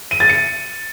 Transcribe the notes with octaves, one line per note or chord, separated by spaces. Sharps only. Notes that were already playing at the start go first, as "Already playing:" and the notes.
D#7
A6
C#7